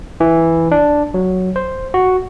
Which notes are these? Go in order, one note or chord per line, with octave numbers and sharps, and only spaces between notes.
E3
D4
F#3
C5
F#4